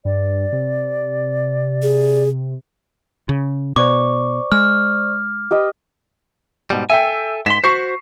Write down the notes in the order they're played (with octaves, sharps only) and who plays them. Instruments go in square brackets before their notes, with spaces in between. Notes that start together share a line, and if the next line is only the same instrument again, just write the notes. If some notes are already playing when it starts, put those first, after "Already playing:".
[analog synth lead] G2 [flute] D5
[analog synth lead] C3
[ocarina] G#4
[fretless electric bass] C#3
[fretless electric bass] B2 [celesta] C5 D5 C#6 [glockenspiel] D6
[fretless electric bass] G#3 [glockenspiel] F6
[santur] G4 B4 D#5
[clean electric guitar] G#2 B2 G3
[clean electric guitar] A4 G#5 [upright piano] E5 G5
[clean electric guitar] G#2 C6 [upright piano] B6 E7
[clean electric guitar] F#4 C5 [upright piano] C#6 C7